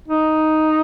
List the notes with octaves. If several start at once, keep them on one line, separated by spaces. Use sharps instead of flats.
D#4